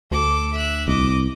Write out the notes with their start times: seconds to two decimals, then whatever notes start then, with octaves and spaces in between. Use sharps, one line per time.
0.11 D2 A4 D6
0.53 E5 F#6
0.88 C2 D#5 D6